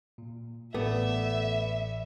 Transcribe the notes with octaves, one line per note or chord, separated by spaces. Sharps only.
A#2
A1 A3 B3 D5 E5